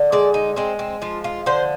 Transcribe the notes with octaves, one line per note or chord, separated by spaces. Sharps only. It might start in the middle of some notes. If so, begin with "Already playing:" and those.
Already playing: D3
G#3 D5
D#4
G#3 C4
C4
F3 F4
F4
D3 C5